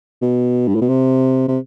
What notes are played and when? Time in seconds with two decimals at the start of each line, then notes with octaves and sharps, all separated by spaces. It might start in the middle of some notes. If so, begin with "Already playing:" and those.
0.22 B2
0.68 G2
0.75 A2
0.82 B2
0.89 C3
1.48 C3